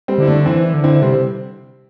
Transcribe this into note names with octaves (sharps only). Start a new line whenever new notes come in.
G3 C4
D3 E4
A3 D4
E3 C4 E4
D3
C4 E4
C3 G3 C4